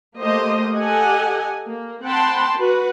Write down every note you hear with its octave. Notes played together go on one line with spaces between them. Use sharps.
A3 A#3 G4 C5 D#5
G4 A4 D#5 F#5 G#5
A#3
C4 F#5 G5 A5 B5 C6
F#4 B4